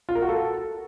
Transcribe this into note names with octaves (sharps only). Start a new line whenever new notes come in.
F4
A#4
F#4
A4